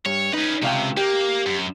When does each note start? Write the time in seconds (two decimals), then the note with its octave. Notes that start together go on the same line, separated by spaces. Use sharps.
0.06 G2 C#5
0.33 C#4 D#4 B4
0.63 C#2 C3 F5 G5
0.97 A#3 G4
1.46 F#2